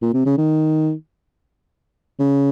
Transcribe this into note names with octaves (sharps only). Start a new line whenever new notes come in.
A#2
C3
C#3
D#3
C#3